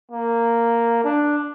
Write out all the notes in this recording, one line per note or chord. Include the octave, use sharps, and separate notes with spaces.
A#3
D4